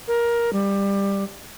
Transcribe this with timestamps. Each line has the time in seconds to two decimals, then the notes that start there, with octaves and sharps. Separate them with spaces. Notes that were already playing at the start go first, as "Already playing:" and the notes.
0.08 A#4
0.53 G3